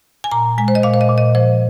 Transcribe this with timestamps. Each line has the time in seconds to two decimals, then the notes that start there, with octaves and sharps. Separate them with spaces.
0.24 G#5
0.32 A#2 A#5
0.58 G#3 G#5
0.68 C5
0.75 D#5
0.83 A#2 F5
0.94 C5
1.01 D#5
1.09 A#2
1.18 D#5
1.35 F3 C5